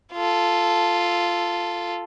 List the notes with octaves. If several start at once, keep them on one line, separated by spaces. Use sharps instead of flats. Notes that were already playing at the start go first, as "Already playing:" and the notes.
F4 A4